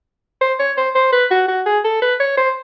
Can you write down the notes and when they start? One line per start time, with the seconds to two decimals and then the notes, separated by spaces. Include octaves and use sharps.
0.41 C5
0.59 C#5
0.77 C5
0.95 C5
1.13 B4
1.31 F#4
1.48 F#4
1.66 G#4
1.84 A4
2.02 B4
2.20 C#5
2.37 C5